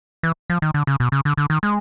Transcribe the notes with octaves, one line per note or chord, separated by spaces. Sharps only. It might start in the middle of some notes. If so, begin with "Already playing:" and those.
E3
F3
D#3
D3
C#3
B2
C#3
D3
D3
D#3
G#3